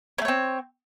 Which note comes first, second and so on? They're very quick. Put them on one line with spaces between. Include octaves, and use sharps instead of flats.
C#4 A3 C#5 C4